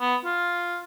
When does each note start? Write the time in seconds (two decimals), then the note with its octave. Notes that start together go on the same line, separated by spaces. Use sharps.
0.01 B3
0.25 F4